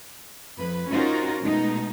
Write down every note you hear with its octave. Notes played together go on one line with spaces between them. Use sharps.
F2 B4
C#4 D#4 F4 F#4 A#4 C5
B2 G#3 A3 D#4